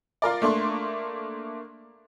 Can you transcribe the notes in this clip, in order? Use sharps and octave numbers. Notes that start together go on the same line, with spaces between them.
F4 A#4 D5
A3 A#3 D4 C6 C#6